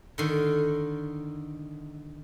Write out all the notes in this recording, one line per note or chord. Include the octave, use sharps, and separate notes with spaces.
D3 D#3